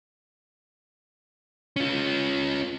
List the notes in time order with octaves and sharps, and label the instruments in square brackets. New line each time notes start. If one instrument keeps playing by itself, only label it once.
[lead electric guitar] C#4 F4